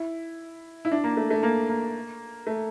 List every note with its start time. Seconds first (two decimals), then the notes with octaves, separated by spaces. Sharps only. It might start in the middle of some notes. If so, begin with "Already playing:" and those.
Already playing: E4
0.85 E4
0.92 D4
1.04 A#3
1.17 A3
1.30 A3
1.43 A#3
1.69 A#3
2.47 A3